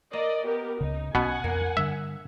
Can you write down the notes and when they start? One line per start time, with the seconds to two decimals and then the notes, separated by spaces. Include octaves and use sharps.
0.13 A#3 D5 D#5
0.44 B3 G4 A#4
0.81 C#2 C#3 D#4
1.15 B1 B2 B3 C#4 F#5 G#5
1.44 F2 A#3
1.77 G2 D3 E5